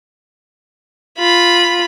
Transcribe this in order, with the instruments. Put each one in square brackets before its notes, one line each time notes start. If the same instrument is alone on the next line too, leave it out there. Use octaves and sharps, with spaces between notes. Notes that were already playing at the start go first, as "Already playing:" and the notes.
[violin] F4 B5